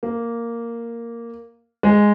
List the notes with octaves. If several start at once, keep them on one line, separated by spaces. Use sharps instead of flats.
A#3
G#3